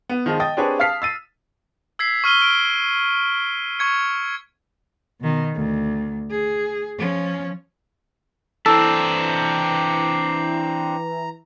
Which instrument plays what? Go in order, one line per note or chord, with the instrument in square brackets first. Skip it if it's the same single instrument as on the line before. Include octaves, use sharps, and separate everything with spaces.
[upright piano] B3
D#3 F3 G#3 D#4
D#5 G5 D#6 A6
C4 D4 G4 G#4 B4 C#5
F5 A5 F6 B6 C7
E6 A6 D#7
[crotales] E6 G#6 B6 C7
C#6 F6 D#7 G7
F6 D7
C#6 G#6 C#7
[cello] B2 D#3
D2
G#4
F3 C#4
[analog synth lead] E3 [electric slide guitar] C4 D4 [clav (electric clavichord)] A4 [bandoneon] A#5